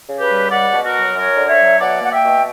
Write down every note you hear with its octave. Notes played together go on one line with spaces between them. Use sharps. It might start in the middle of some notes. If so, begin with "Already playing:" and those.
C#3
G4 B4
G3
C#2 D5 F#5
B2
F#4 A#4
F#3
F#2 A#4 C#5
D3
C#5 E5
F#3
B2 D5 F#5
A#3 F#5
E5 G5
B2